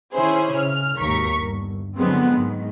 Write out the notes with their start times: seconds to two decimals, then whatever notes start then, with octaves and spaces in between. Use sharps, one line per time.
0.13 D#3 C#4 E4 G#4 C5
0.55 C#3 F6
1.00 G#1 D#2 A#4 C#6 B6
1.36 G1
1.97 D3 F3 F#3 G#3 B3 C4
2.34 G#2 D#3